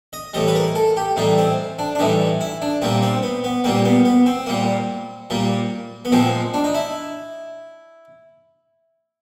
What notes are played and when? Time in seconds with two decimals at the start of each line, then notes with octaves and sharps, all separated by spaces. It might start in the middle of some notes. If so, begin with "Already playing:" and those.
0.13 D#5
0.34 A2 E3 G3 D#5
0.48 B4
0.55 A#4
0.75 A4
0.97 G4
1.16 A2 E3 G3 D#4
1.38 C4
1.79 D4
1.95 D4
1.99 A2 E3 G3 D#4
2.41 E4
2.62 D4
2.82 A#2 G3 A#3 C4
3.02 C4
3.23 B3
3.44 B3
3.64 A#2 G3 A#3 C4
3.85 B3
4.05 B3
4.26 C4
4.46 A#2 G3 A#3
5.30 A#2 G3 A#3
6.05 B3
6.12 A#2 F3 G#3 C4
6.54 D4
6.64 D#4
6.74 E4